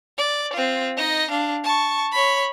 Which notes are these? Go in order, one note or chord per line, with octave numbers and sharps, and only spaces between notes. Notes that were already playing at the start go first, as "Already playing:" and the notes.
D5
C4 F4
D#4 D#5
D4 F5
A5 C#6
C#5 B5